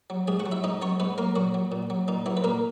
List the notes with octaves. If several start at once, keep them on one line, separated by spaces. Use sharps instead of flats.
F#3
G#2 G#4 G#5
F#4 F#5
F#3
E4 E5
G#2 D#4 D#5
F#3 C#4 C#5
G#2 B3 B4
F#3 A#3 A#4
A#2 F#3 F#4
F#3
A#2
F#3
A#2 D#4
E3 F#3 E4
B4
A#2 A#3 A#4